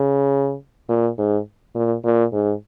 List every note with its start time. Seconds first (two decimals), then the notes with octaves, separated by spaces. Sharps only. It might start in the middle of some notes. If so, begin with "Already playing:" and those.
Already playing: C#3
0.89 A#2
1.18 G#2
1.75 A#2
2.04 A#2
2.33 G#2